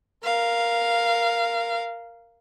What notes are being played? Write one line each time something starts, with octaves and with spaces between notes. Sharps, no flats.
A#4 F5